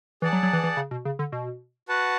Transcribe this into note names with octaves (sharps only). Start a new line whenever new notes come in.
E3 G#4 D5 F#5 A5
F#3
F#3
E3
E3
C#3
B2
C#3
D3
B2
F#4 B4 F#5 A5